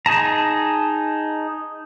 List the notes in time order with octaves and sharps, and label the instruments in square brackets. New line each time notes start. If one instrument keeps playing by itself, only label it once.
[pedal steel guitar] D#4 G#4 A5 A#5